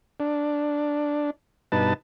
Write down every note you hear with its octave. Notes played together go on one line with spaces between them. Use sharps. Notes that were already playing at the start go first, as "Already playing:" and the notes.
D4
G2 B2 D#4 B4 A5